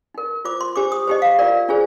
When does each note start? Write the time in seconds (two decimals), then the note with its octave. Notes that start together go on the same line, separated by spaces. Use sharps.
0.14 D#4 A#4
0.45 F4 C5 D6
0.61 C6
0.76 D4 G4 C5 D6
0.92 D#6
1.07 D#4 G4 C5 D#5
1.22 F5
1.39 F4 A#4 D5
1.68 D4 F4 G#4 C5